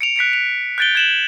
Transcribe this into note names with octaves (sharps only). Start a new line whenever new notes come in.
C#7 D7 F7
F#6 B6 C#7 D7
F7
F#6 G6 A6 D7 G7
G#6 E7 F#7